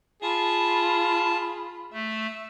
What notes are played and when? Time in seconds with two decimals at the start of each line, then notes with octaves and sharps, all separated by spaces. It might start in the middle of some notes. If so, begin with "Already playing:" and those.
0.22 F4 G#4 A5 B5
1.93 A3 E5